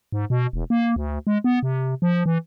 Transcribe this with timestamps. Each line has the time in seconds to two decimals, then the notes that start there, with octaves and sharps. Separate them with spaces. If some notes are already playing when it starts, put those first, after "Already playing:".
0.12 G#2
0.30 B2
0.53 E1
0.70 A#3
0.96 D2
1.27 G#3
1.44 B3
1.63 C3
2.02 F3
2.26 E3